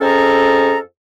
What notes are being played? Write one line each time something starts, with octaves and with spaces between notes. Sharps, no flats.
F2 C#4 G#4 A4 A#5